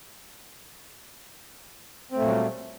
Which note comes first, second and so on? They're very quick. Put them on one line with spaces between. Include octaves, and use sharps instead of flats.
C4 A3 A#2 F#3 G3